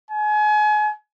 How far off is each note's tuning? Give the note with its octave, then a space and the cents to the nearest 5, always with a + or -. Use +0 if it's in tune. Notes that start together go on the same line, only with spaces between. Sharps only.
G#5 +35